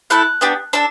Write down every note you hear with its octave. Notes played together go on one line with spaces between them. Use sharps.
A3 E4 A4 F#6
B3 D4 G4
D4 A4 E6